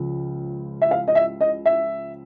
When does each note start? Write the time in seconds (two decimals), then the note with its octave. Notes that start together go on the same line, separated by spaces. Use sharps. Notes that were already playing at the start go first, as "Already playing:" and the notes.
Already playing: C#2 C#3 F3
0.82 E5
0.91 F5
1.08 D#5
1.15 E5
1.41 D#5
1.66 E5